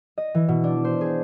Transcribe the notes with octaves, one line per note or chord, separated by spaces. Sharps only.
D#5
E3
B2
D4
C5
G#4